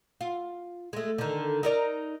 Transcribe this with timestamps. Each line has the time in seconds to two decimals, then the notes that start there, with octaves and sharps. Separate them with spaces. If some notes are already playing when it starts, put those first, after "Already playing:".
0.21 F4
0.93 G#3 A3
1.18 D3 D#3
1.63 D#4 A#4 D5